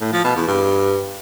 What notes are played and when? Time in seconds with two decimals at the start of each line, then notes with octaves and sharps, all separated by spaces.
0.01 A2
0.13 F3
0.24 B2
0.36 E2
0.47 G2